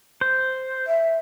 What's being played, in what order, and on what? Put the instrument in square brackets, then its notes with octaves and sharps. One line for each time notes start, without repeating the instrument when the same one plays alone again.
[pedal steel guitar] C5
[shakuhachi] E5